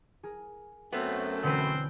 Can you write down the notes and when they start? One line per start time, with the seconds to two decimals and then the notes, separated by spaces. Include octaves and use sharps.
0.23 G#4 A#4
0.93 F#2 A3 B3 C4
1.43 E1 D3 C4 C#4 B4 F#5